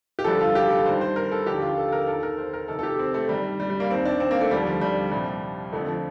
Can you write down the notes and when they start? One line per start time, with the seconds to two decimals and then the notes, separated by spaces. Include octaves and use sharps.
0.19 G4
0.24 G2 D3 F3 A4
0.41 F4
0.55 G4
0.70 A4
0.86 G2 D#3 C5
1.01 C5
1.16 A#4
1.32 A4
1.47 D#2 D3 F3 G4
1.62 F4
1.78 A4
1.92 A#4
2.07 D#2 D#3 A4
2.23 A#4
2.38 C5
2.54 A#4
2.68 F2 C3 D#3 A4
2.79 A4
2.83 G4
2.99 C4
3.14 A3
3.29 G2 D#3 G3
3.60 G3
3.70 G3
3.80 A#3
3.90 D#2 D#3 C4
4.05 D4
4.20 C4
4.31 A#3
4.41 A3
4.51 D#2 D3 F3 G3
4.66 F3
4.81 G3
5.11 C2 A#2 F3 G3
5.73 F2 D3 F3 A3
5.88 F3